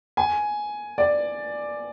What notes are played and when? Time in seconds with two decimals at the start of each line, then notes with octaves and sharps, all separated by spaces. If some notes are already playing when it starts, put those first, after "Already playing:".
0.17 G#5
0.98 D5